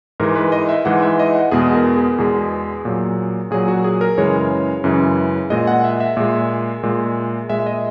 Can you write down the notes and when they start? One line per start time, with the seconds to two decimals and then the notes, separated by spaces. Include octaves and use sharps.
0.20 G#2 E3 G#3 A#4
0.35 B4
0.52 D#5
0.69 E5
0.85 G#2 E3 G#3 F#5
1.02 E5
1.19 D#5
1.35 F#5
1.51 E2 B2 G#3 G#4
1.75 A#4
1.96 G#4
2.18 E2 B2 G#3
2.85 A#2 F#3
3.51 A#2 F#3 G#4
3.68 F#4
3.84 G#4
4.01 A#4
4.18 F#2 C#3 E3 G#3 C#5
4.84 F#2 C#3 E3 G#3
5.50 A#2 G#3 D#5
5.67 F#5
5.84 E5
6.00 E5
6.17 A#2 G#3
6.83 A#2 G#3
7.49 A#2 G#3 E5
7.60 E5
7.66 D#5